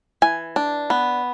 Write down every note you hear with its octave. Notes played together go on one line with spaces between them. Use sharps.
E3 G#5
D4
B3